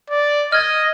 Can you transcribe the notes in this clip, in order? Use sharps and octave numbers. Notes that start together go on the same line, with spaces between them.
D5
D#5 F6 G#6 A6